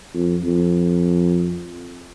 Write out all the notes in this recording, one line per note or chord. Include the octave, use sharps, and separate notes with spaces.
F2
F2